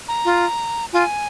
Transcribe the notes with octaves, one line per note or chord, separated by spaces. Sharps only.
A#5
F4
F4 G#5